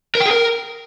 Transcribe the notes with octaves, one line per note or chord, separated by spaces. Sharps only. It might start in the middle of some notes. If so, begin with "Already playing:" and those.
A#4
G5
G#4
A#4